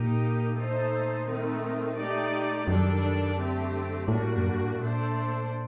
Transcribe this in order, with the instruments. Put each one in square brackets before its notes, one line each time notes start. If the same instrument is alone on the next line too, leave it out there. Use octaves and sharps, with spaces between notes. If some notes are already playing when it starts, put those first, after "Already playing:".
Already playing: [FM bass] A#2 [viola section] A#3 D#4 G4
[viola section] A3 D#4 A4 C5
D#3 A3 C4 D#4
A3 D#4 G4 D5
[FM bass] F#2 [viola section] D#3 G3 D4 A4
[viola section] D3 A3 C4 G4
[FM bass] A2 [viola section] G3 A#3 D4 F#4
[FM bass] F#2
G2
A2
[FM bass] A#2 [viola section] A3 D4 A4 C5